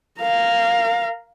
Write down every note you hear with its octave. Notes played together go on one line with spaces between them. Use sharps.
A#4 F5